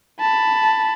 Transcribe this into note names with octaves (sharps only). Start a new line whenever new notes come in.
A5 B5